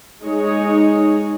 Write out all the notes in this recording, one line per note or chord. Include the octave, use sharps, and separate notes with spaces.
G#3 D#4 G#4 C#5